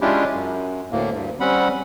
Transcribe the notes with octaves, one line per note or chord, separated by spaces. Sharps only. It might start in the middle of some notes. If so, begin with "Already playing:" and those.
G#3 C#4 D4 E4 F4 G4
F#2
D2 A2 A#3
D2 G2
G3 C4 C#4 F#5 B5